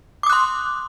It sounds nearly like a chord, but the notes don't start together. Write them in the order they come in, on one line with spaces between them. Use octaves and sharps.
D6 D#6 F#6 C6